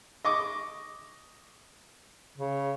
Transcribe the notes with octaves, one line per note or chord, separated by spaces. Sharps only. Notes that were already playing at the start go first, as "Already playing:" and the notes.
D#5 C#6 D6
C#3